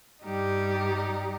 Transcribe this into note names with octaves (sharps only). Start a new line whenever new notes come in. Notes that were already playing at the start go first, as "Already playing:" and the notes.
G2 G3 D#4 G4